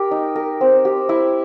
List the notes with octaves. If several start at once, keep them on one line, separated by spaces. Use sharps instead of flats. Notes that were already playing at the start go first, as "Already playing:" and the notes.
Already playing: G4 A#4
D#4
A#4
C4
G4
E4